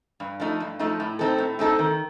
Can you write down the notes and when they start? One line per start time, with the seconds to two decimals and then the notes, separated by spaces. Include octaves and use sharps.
0.20 G2
0.40 F3 A3 D#4
0.60 G2
0.79 F3 A3 D#4
1.00 A2
1.19 A3 C4 D#4 A4
1.38 A2
1.59 A3 C4 D#4 A4
1.79 D#3